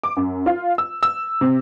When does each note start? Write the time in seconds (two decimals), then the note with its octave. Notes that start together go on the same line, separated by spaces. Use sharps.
0.03 D6
0.16 F#2
0.46 F4
0.78 E6
1.03 E6
1.41 C3